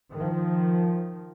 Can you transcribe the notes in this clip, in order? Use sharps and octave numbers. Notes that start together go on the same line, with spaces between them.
D#3 F3